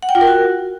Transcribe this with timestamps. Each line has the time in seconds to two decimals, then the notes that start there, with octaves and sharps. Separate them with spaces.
0.03 F#5
0.09 G5
0.15 F4
0.21 A#4
0.27 F#4